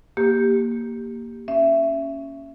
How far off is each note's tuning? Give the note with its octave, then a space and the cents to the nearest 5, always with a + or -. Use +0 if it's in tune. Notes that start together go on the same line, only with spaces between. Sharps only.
A#3 +0 G4 +0
C#4 +0 E5 +15